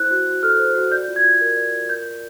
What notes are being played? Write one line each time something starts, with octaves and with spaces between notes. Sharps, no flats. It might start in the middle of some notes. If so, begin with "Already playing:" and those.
Already playing: E4 C5 F#6
F#4
F#4
A4 F6
C5
F#4
D5 G6
F4
G#6
F4
A#4
D5
F4
A#4 G6
D5